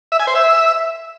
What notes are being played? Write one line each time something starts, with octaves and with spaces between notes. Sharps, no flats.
E5
G#5
C5
E5